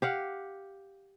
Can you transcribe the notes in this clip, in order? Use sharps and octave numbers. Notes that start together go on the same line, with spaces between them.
G4 F5 F#5